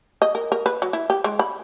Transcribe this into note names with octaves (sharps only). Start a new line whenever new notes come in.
D#5
A#4
A#4
B4
F#3
E4
G4
G#3
B5